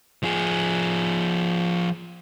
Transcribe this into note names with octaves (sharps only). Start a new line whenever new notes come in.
F3 G#4